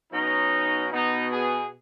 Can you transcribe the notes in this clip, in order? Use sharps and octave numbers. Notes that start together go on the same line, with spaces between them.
B2 F#3 C#4 D#4
B2 B3 D#4
G#4